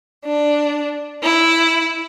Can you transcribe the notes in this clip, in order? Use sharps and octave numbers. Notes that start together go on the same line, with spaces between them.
D4
E4